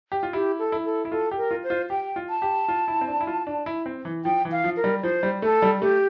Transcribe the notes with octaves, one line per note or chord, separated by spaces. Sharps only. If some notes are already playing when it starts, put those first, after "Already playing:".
G4
F4
E4 G4
A4
E4
A4
E4
F4 A4
G4
A#4
F4
C5
F4
G4 G5
F4
A5
G4
F4
E4
C4
D4
E4
F4
D4
E4
C4
E3
F3 G5
E3
F5
F3
A#4
G3
F3 C5
G3
A3 A4
G3
A3 G4